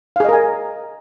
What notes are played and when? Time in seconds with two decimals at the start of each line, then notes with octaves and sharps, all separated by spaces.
0.16 F5
0.20 G#4
0.24 D#5
0.29 A#4
0.33 G#5